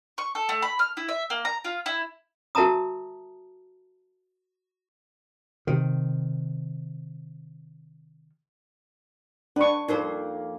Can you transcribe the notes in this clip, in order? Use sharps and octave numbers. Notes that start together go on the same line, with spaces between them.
C#6
A4
A3
B5
F6
E4
E5
A#3
A#5
F4
E4
F#4 A#4 E5 A5 A#5 D#6
C3 D#3
D4 B4 C#6
F2 A#3 D#4 A#4 C5